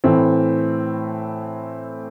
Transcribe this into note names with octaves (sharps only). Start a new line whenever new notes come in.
A2 E3 A3 C4